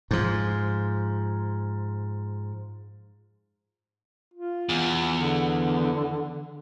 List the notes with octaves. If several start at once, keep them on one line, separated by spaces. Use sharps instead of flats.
G#2 F3
F4
E2
D3